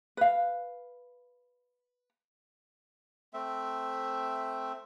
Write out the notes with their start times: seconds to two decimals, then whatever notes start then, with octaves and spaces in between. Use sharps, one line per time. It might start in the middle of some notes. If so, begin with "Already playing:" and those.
0.17 B4 F5
3.34 A3 C4 E5